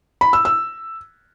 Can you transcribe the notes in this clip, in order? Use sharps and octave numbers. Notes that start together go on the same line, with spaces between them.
B5
E6
E6